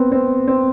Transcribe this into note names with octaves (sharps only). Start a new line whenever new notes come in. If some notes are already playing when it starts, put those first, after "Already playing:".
Already playing: B3 C4
C4
C4